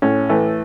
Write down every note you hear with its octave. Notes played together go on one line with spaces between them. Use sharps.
A2 C#4
E3 A3